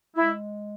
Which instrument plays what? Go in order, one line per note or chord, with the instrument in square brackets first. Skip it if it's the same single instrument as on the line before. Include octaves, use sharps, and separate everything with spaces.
[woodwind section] G#3 E4